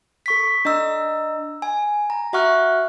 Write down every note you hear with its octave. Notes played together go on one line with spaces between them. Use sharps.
A4 C#6 B6
D4 D#5 A#5 E6
G#5
A#5
F#4 E5 F#5 C#6 F6 F#6